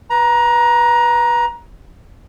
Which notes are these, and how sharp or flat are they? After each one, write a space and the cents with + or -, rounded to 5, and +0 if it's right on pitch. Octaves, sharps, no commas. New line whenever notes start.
B4 -10 A#5 +20